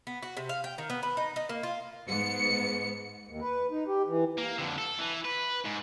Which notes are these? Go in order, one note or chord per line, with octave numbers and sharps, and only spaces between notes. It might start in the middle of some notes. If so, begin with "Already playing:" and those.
B3
F#4
C3
F5
G5
D#3
B3
B4
D#4
D#4
A#3
F4
G#2 B3 C#7
D#2
B4
D#4
G4
E3
A#3
F2 D3
A4
E3
B4
G#2